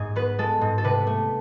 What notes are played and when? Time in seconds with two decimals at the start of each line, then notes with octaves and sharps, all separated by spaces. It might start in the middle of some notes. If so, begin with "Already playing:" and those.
Already playing: G#2 G#4
0.16 B3 B4
0.38 G#3 A4
0.61 G#2
0.78 A4
0.84 C3 B4
1.07 A3